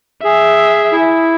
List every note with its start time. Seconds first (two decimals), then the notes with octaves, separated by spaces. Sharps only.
0.24 G#4 E5
0.92 E4